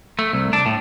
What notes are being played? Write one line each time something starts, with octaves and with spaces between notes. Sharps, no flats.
A3
C2
D4
A2